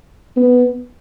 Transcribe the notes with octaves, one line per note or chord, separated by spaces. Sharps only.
B3